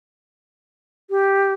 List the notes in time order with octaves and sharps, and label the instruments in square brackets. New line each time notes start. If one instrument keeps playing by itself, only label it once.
[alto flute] G4